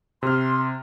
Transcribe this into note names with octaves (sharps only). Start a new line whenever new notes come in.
C3 C6 F6